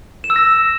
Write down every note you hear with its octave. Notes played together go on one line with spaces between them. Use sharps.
E7
E6
A#6